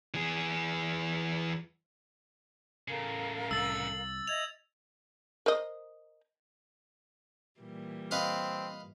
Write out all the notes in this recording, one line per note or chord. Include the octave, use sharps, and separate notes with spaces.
E3 G#4
A2 C#3 A4 A#4 F5
C2 E6 A6
D#5 E5 G#6 F7
A#4 C5 D#5
A#2 E3 G3
C4 B4 D#5 F5